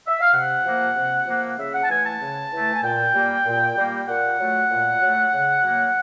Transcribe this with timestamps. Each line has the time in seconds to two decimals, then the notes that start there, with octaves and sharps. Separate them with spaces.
0.07 E5
0.20 F5
0.33 C3 F#5
0.65 F3 A#3
0.96 C3
1.27 F3 A#3
1.58 C#3 E5
1.74 F#5
1.83 A5
1.90 E3 A3 G#5
2.05 A5
2.21 C#3
2.52 E3 A3
2.73 G#5
2.83 A#2 G5
3.15 G3 A#3
3.46 A#2
3.76 G3 A#3
4.08 A#2 F#5
4.38 F#3 A3
4.71 A#2
5.02 F#3 A3
5.33 C#3
5.63 F#3 A#3